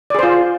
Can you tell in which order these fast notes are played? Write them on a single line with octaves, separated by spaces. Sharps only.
D5 G#4 C5 F4